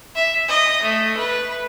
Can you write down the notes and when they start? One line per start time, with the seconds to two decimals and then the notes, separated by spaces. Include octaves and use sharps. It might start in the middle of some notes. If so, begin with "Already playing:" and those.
0.15 E5
0.48 D#5
0.82 A3
1.17 B4